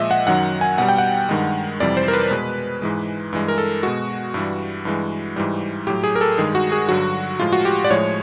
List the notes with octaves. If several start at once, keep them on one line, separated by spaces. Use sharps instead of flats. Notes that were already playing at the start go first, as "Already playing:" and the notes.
Already playing: A#2 F3 G#3 D#5 E5
F#5
F#2 D#3 F#3 F#5
G#5
B2 G3 F#5
G5
F#5
G2 D#3 G#3
F2 C3 E3 G3 D5
C5
A#4
B4
B2 G#3
G#2 E3 G#3
G2 E3 G#3
A#4
A4
B2 G#3 F#4
G2 E3 G3
G2 E3 G#3
G#2 E3 G3
A2 F#3 G4
G#4
A#4
A4
G2 D#3 G#3 G#4
F#4
G#4
G2 D3 F#3 F#4
A2 F3 G#3 F4
F#4
G4
D5
A2 F3 G#3 C#5